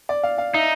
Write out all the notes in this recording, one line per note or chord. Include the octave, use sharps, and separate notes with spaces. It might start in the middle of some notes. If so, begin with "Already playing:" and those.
D5
F5
F5
D#4 E5